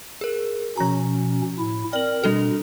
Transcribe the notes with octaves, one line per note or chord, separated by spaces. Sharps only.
G#4 A#4
B2 F3 C#4 A#5
A2 E4
C4 A#4 D5 F#7
B2 G3 D4 A4